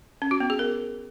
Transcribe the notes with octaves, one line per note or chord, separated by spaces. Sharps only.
C#4
F#4
B3
G#4
A#4